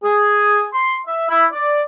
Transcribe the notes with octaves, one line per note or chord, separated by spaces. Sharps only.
G#4
C6
E5
E4
D5